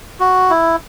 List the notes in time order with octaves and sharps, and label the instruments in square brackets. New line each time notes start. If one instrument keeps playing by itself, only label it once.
[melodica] F#4
E4